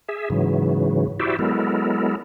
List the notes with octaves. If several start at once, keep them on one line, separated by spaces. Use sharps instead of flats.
G#4 E5
G#2 C#3 E3 F#3
E4 F#4 G4 C5 D5 E5
F#3 G#3 B3 E4 A4 A#4